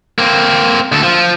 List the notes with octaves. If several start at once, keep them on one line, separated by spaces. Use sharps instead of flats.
A#3 C4
D2 A4
F3